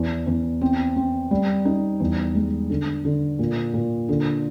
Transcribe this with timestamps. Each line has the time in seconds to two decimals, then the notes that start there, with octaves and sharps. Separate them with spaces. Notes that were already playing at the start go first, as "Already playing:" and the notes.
Already playing: E2
0.27 E2
0.61 C4
0.96 C4
1.31 G3
1.65 D#4
2.00 E2
2.35 G#3
2.70 D3
3.05 D3
3.39 A#2
3.74 A#2
4.09 D3